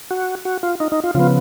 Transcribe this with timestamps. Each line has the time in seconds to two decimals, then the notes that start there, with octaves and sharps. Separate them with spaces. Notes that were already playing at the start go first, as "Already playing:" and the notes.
0.11 F#4
0.45 F#4
0.63 F4
0.80 D#4
0.92 D#4
1.04 F4
1.14 C#3 F3 B3 F4